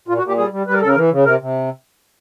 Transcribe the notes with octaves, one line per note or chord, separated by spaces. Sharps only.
A#2 F4
F#4
A#2
G4
G3 G#4
G3
G3 B4
A#4
C#3 A4
A#4
E3
C#3
C3 A#4
C3